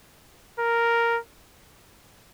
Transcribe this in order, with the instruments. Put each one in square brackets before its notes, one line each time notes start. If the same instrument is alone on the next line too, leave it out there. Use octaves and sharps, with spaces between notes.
[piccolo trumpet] A#4